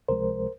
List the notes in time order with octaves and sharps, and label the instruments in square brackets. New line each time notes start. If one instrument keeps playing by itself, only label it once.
[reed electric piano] C#2 C3 F3 G#3 A#4 C5